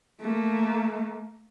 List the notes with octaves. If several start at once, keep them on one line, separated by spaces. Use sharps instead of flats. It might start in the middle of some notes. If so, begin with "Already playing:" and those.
A3 A#3